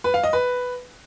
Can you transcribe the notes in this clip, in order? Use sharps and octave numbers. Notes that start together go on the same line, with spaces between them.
B4
F5
D#5
B4